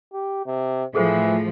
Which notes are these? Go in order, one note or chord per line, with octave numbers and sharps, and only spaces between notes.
G4
C3
A2 E3 F3 G#4 A4 C5